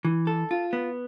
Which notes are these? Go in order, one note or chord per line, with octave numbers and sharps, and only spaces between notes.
E3
A4
F4
B3